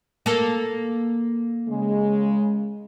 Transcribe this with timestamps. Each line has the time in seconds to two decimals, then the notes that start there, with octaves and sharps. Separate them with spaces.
0.26 A#3 A4
1.69 C#3 G#3